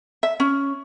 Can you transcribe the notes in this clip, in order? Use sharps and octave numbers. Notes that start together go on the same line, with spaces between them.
E5
C#4